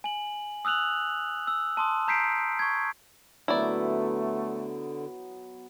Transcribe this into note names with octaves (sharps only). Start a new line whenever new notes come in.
G#5 F#7
D#6 E6 F#6 F7 F#7
E6
A5 C6 D#6
A#5 G6 B6 C7 D7
C#6 G#6
D3 F#3 A3 B3 E4 D5